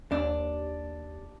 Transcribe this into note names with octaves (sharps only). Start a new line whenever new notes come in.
D#2 D4